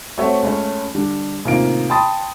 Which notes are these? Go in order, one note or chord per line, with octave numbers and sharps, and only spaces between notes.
A3 C4 F#4 C#5 E5 F#5
C#2 A3 C#4
D3 G3 D4
A1 C3 D#3 A#3 F4 D7
G5 A5 B5 C6 D#6 A6